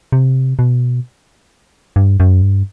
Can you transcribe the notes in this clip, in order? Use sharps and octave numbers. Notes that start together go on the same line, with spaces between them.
C3
B2
G2
F#2
G2